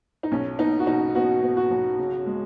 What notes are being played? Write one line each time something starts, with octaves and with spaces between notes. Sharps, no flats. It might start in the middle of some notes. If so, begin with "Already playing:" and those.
D#4
B1 C#4
B3 D#4
F#4
B2 D#4
B3 F#4
B3
F#4
B1
C#3
G#3